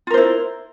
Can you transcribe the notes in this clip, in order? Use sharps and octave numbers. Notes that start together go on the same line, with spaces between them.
E4 F4 A#4 C5